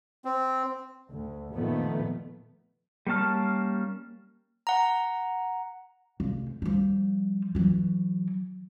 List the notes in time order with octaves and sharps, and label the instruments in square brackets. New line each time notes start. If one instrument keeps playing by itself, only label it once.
[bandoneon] C4
[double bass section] D2
F2 A#2 D#3 F3 A3 B3
[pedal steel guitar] G3 A#3 C#4 A5 F6
[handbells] F#5 A#5
[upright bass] F1
F3 G3
E3 F#3